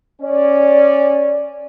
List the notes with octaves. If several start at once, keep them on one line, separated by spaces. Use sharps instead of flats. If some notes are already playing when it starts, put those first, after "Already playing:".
C#4 D5